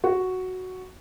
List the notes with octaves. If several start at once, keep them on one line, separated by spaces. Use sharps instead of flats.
F#4